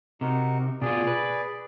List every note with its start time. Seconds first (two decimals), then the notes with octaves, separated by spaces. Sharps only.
0.21 C3 D#4 F#4 A#4
0.82 B2 B3 F4 G#4 D5
1.07 B4